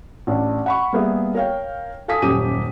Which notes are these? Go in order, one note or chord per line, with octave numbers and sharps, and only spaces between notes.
A1 D4
F#5 B5 C#6
G3 A#3 B3 G#4 E5
A#4 C#5 F5 G5
A4 F5 G#5 D#6 B6
D#1 F#2 G4 D#6 D#7